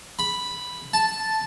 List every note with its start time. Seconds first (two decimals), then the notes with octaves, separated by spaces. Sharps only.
0.19 B5
0.93 A5